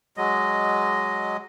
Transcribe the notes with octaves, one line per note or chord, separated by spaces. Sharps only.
F#3 G#3 D#5